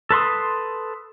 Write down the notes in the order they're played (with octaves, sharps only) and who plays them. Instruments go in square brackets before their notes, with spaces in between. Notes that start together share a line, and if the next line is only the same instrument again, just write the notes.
[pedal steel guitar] A4 B4 C6 D#6